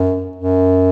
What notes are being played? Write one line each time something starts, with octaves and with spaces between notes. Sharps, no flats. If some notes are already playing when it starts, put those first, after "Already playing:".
Already playing: F#2
F#2